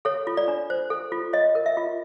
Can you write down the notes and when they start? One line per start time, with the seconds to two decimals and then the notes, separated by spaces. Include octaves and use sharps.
0.05 A4 C#5
0.27 F4
0.37 D5
0.48 D4
0.70 C5
0.90 A4
1.12 F4
1.33 C#5 D#5
1.55 A#4
1.66 E5
1.77 F4